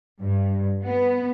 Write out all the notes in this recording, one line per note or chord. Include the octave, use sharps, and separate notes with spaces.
G2
B3